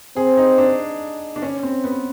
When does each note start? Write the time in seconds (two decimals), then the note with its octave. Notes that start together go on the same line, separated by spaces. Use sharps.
0.16 C4 G#4
0.37 D#4
0.58 D4
1.36 D4
1.42 C#4
1.63 C4
1.84 B3